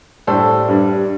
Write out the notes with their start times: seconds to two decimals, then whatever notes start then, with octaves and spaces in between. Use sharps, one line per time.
0.27 A2 G3 D4 A4 C5
0.68 G2 G3 D4